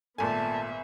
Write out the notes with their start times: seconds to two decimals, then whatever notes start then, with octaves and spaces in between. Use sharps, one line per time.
0.18 G#1 A#2 A3 B3 E5 G#5 A5